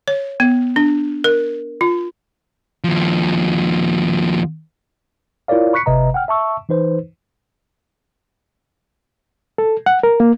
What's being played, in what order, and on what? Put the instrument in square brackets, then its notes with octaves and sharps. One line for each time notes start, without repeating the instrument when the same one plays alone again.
[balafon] C#5
B3
D4
A#4
F4
[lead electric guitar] D#2 F3
[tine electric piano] E4 F4 A#4 C#5 D5 F5
B5 C#6 F#6 B6 C#7
G1 C3 B4 D#5 E5 A#5
F#5 G5 F6
E5 A5 C#6 E6
E3 D#4 B4 C5
[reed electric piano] A4
F#5
A#4
A#3